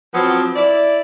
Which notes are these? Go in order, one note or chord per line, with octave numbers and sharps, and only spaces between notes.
F3 F#3 B3 C4
E4 D5